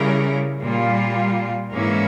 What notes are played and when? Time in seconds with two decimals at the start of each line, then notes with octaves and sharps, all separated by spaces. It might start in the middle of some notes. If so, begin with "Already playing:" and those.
Already playing: C#3 G3 C#4 E4 A#4
0.59 A#2 G3 A#3 F4
1.71 G#2 E3 A#3 C#4 E4